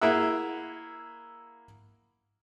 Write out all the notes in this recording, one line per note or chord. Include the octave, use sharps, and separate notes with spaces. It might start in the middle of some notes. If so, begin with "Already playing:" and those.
A#3 E4 G#4 E5 F#5 E6